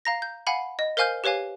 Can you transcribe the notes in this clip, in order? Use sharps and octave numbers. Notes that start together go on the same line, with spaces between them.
F5 A#5 A#6
G6
F5 F#5 G#5 B5
D#5
A#4 C5 F5 G#5 F6 G6
G4 B4 C#5 F5 G#5